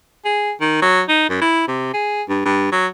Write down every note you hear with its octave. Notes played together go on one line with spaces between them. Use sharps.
G#4
D#3
F#3
D#4
F#2
E4
C3
G#4
G2
G2
F#3